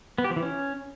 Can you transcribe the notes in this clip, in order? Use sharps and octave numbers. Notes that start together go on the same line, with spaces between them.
B3
G4
F3
E3
C#4